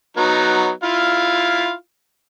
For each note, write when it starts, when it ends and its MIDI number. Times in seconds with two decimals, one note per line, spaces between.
0.17 0.71 54
0.17 0.71 59
0.17 0.71 63
0.83 1.73 64
0.83 1.73 65
0.83 1.73 77